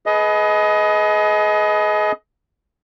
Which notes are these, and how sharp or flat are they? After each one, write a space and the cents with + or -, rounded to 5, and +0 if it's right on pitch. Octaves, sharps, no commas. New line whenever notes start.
G#4 +35 B4 +0 D#5 +20